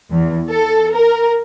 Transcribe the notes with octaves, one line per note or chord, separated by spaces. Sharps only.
E2
A4
A#4